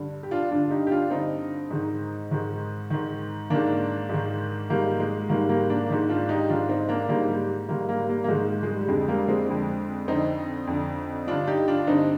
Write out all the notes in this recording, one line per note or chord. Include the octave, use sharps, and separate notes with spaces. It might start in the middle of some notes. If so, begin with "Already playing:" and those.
Already playing: G2 D3
G4
D4 F4
G2 D3 D4 F4
D#4 G4
G4
D4 F4
G2 D3 C4 D#4
G#2 D#3
G#2 D#3
G#2 D#3
G#2 D#3 A#3 D4
G#2 D#3
G#2 D#3 G3 A#3
G#3
G#2 D#3 G3 A#3
G3 A#3
A#3 D4
G#2 D#3
D4 F4
D#4 G4
G#2 D#3 D4 F4
C4 D#4
A#3 D4
G#2 D#3 G3 A#3
G3
G#2 D#3 G3 A#3
G3 A#3
G3 A#3
A#3
G#2 D#3 G#3
G#3
G3
G3
F2 D3 G#3
G3 A#3
G#3 C4
F2 D3
F2 D3 C4 D#4
F2 D3
G2 D3 D4 F4
D#4 G4
D4 F4
G2 D3 C4 D#4